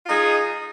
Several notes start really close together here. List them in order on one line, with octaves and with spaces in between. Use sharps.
F4 D#4 G#4